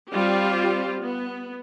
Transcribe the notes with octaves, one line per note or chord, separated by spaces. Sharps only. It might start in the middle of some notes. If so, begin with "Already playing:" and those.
G3 C4 F4 G4
B3